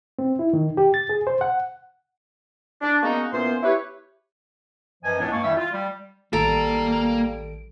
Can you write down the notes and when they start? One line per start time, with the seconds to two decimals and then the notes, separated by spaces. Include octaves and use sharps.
0.19 C4
0.39 E4
0.53 D#3
0.77 G4
0.94 A6
1.09 G#4
1.27 C5
1.41 F#5
2.81 D4
3.02 G#3 A#3 B3 C#4 D#4 F#4
3.33 A#2 E3 B3 C#4 C5
3.63 E4 G4 B4 C#5
5.04 F#2 E3 F3 D#5 G#5
5.19 C#2 A2 B3 C#4 D4
5.31 G2 G#3 A#3 G#5 C#6
5.44 F2 D#3 G3 E4 E5
5.57 F4
5.72 G3
6.33 A1 D#3 G3 A#3 A4 A#5 D7